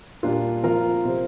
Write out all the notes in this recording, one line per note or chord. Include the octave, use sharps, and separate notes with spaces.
A#2 G3 A#3 D4 F4
F3 C4 F4 A#4
C3 G3 C4